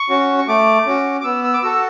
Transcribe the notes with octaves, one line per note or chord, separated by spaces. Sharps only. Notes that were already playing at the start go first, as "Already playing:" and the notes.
Already playing: C#6
C#4 F#4
C#6
A3 D6
C#4 F#4
D6
B3 E6
E6
D6
F#4 A4 E6